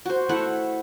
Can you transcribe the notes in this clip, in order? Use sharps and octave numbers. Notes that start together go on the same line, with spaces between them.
F#4 C5
A3 E4 F#5